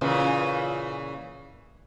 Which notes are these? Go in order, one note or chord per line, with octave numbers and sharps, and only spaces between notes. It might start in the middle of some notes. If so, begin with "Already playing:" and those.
A#2 C#3 E3